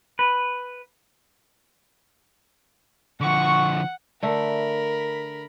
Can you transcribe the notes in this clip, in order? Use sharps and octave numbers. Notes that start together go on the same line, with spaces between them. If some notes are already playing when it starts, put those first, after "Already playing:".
B4
D3 F3 F#5 C#6
D3 A3 A#4 B5